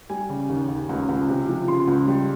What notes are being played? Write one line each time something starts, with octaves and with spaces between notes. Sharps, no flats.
G3 G#5
C#3
D#2
D#2
C#2
C#2
C3
F3
C#3 C6
C#2
G3